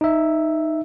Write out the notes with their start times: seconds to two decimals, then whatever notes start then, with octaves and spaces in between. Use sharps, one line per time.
0.01 D#4 E5